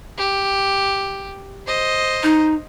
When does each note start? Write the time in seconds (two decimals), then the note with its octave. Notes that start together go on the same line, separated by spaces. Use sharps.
0.18 G4
1.67 C5 D#5
2.23 D#4